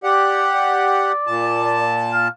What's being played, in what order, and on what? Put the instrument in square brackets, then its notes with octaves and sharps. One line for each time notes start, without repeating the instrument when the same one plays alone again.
[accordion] G4 F#5 [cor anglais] D5
[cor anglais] D5
[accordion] A#2 A5
[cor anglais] F5